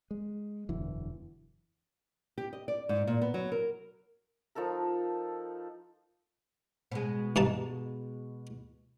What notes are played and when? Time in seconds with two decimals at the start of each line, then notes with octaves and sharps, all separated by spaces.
0.11 G#3
0.69 E1 F#2 D3 E3
2.38 G4
2.53 D#5
2.68 D5
2.89 G#2
3.07 A#2
3.22 B3
3.34 F#3
3.52 A#4
4.55 F3 D#4 A4 A#4
6.92 B2 G#3
7.36 G2 D#4 A5